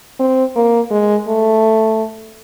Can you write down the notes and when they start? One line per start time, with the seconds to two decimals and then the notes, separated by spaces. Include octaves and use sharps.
0.19 C4
0.55 A#3
0.91 G#3
1.28 A3